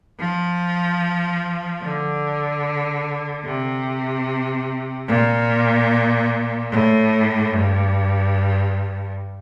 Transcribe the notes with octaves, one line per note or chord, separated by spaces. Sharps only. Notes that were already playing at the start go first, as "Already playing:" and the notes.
F3
D3
C3
A#2
A2
G2